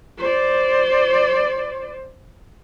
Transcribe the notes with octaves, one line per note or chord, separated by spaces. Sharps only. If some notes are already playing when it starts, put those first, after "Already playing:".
C5 D5